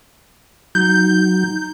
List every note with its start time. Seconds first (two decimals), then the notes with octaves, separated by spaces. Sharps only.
0.75 F#3 D#4 G6